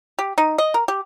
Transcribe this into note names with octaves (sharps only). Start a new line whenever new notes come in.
G4
D#4
D#5
A#4
G4